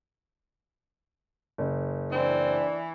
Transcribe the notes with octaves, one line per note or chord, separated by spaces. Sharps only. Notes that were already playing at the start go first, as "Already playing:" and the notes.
F#1
E3 C4 D4